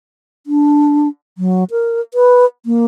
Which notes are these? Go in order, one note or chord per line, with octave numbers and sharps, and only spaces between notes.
D4
F#3
A#4
B4
A#3